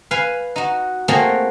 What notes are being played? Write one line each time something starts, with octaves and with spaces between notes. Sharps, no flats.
B4 F5 G#5
D#4 F#4
A3 A#3 C4 F#4 G#4 C#5